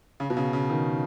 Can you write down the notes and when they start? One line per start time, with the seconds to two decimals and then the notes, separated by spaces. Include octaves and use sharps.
0.20 C#3
0.30 B2
0.37 C#3
0.53 C#3
0.70 D#3